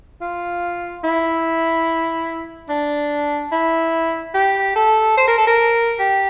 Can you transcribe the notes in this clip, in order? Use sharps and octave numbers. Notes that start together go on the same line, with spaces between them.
F4
E4
D4
E4
G4
A4
C5
A#4
A4
A#4
G4